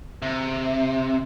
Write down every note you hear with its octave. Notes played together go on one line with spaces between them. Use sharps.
C3